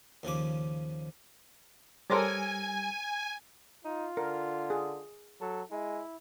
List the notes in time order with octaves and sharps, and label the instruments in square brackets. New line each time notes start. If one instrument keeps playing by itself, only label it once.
[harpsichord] D#2 C#3 F3 D6
[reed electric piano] G3 [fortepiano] A4 A#4 D6 [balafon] C5 C#5 C6 [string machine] G#5
[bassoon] D#4 [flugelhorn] F4
[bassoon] D3 [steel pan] A#4
[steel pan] G#4
[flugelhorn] F#3 [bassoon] A4
[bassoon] G#3 [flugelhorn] E4